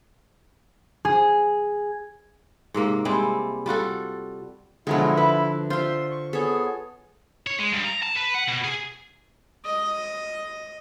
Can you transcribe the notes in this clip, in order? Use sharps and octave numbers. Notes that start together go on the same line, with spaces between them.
G#4
G#2 C3 A#3 A#4
G3 G#3 C4 E4
G3 F4 F#4 A4
B2 D3 F3 F#3 G#3 E4
B4 E5
F4 C5 E5 C6
C#6
B3 G#4 A4 C#5
C#5
G#3
G2
A#5
A5
B4
F#5
B2
G#4
D#5